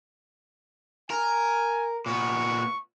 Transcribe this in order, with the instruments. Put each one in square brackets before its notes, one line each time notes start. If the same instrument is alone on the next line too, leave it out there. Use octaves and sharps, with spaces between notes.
[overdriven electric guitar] A#4 [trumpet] G#5
[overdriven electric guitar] A#2 B3 [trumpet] C#6